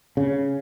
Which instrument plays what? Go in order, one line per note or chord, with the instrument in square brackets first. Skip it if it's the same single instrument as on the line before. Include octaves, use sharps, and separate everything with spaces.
[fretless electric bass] C#3